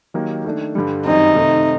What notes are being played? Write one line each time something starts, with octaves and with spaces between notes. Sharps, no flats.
D#3 F#3 A#3 D#4 G4
D#3 A3 D4
G2 D3 G3
F#2 D#3 G3 C4 D#4
C3 D#3 A3 C4